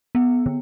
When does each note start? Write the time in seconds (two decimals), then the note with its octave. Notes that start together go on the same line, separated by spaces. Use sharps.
0.15 B3
0.46 D3